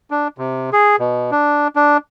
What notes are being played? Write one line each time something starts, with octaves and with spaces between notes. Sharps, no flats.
D4
C3
G#4
B2
D4
D4